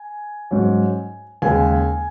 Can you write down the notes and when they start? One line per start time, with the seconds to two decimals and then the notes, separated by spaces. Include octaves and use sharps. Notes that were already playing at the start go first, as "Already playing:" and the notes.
Already playing: G#5
0.51 G#2 F#3 C#4
1.42 D#2 C#3 G#3 G#5